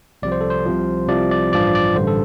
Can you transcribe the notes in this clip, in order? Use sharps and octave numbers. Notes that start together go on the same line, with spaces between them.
C2 C3 F3 D5
C5
A4
C5
C2 C3 F3
C2 C3 F3 D5
D5
A1 G2 F3 D5
D5
A1 G2 D3 C5
A4